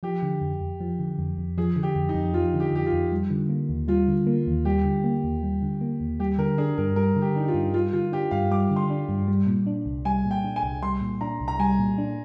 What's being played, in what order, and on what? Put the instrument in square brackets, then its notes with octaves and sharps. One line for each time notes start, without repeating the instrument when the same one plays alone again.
[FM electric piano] F3 [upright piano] G4
[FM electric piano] D3
F2
F2
F3
D3
F2
F2
[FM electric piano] F3 [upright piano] G#4
[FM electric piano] D3
[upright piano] G4
[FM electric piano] F2
[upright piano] D#4
[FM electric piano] F2
[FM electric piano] F3 [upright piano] F4
[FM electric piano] D3
[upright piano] G4
[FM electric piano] F2 [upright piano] G4
[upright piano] F4
[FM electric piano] F2
G3
D3
A#3
D#2
[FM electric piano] G3 [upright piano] F4
[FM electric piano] D3
A#3
D#2
[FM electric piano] G3 [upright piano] G4
[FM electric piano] D3
A#3
D#2
G3
D3
A#3
D#2
[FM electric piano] G3 [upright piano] G4
[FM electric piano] D3 [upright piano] A#4
[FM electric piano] D4 [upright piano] G#4
[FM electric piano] G2 [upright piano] A#4
[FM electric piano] G3 [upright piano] A#4
[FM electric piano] D3
[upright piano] G4
[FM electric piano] D4 [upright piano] D#4
[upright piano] F4
[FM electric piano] G2
[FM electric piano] G3 [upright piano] F4
[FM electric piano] D3 [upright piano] F4
[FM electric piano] D4 [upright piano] G4
[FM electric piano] G2 [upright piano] F5
[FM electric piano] G3 [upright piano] D6
[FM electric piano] D3
[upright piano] C6
[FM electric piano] D4
G2
G3
A#2
D4
C2
[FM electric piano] G3 [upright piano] G#5
[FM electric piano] A#2
[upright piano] G5
[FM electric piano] D4
[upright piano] G#5
[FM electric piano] C2
[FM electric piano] G3 [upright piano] C6
[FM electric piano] A#2
[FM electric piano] D4 [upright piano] A#5
[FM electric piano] C2
[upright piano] A#5
[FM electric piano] G3 [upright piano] G#5
[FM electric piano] A#2
D4